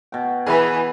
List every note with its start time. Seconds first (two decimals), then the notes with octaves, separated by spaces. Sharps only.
0.12 B2 G5
0.46 E3 G#4 B4